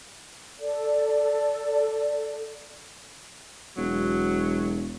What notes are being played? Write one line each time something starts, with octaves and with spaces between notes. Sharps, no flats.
A4 D5
E1 F#3